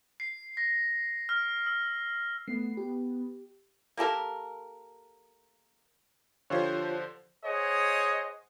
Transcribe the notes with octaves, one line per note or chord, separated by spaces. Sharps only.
C7
A#6
F6
E6
A3 B3 C7
G4
A#3 G4 A4 A#4
D3 F3 F4 G4 C5 C#5
G#4 C5 C#5 D#5 F#5